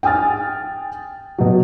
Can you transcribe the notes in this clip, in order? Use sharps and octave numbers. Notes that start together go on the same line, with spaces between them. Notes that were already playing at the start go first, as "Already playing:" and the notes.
G5 G#5 D#6 F6 A6
B2 F#3